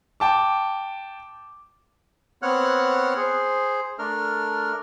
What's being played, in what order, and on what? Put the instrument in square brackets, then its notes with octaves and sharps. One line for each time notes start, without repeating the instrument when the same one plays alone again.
[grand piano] G5 A5 D6
[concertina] B3 C4 C#5 F#5 F6 F#6
G#4 C5
A3 D4 A#4 F6